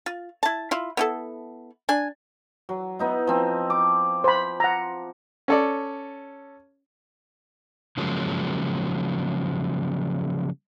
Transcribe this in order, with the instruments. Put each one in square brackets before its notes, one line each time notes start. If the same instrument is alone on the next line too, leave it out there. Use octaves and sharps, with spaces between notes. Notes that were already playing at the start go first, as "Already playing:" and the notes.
[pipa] F4
E4 A5
E4 F4
B3 E4 A4
D4 G#5
[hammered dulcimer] F#3
B3 D#4 E4
F3 C4
D6
[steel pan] C5 B5
F#5 A#5
[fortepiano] C#4 A4 D5
[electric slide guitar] C#3 F3 F#3 G#3 A#3